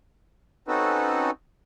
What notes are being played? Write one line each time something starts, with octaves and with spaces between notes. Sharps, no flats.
C4 C#4 D#4 F#4 A4 B4